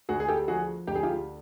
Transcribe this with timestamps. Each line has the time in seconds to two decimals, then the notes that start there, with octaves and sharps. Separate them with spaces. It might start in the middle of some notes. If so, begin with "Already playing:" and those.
0.09 D2 F#4 G#4
0.20 G#4
0.28 G4 A4
0.48 F3 F#4 G#4
0.87 D2 G4
0.95 G#4
1.03 F4 G4